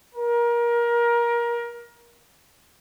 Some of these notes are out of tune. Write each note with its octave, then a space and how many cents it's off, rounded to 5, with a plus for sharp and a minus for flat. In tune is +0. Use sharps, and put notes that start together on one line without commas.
A#4 +25